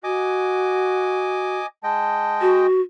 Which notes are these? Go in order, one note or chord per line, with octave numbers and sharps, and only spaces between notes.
F#4 D#5 G#5 D6
G#3 D#5 G5 A5
F#4